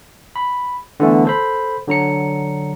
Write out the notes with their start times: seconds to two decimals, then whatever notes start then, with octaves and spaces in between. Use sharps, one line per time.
0.36 B5
1.00 D3 E3 A3 B3
1.25 A4 C5 B5
1.87 D3 F#3 A#5 C#7